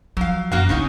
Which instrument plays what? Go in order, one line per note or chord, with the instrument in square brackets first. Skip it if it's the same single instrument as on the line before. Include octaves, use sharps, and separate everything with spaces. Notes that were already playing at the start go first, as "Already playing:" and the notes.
[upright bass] F3 [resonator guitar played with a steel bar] F#3 F5
[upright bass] F#2 [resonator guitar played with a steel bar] A#3 F#4 F5
[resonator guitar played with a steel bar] C#3 C#4 D#4 [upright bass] A#3 B3